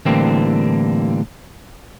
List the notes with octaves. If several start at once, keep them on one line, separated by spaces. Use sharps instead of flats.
A2 D3 E3 G3 A#3 C4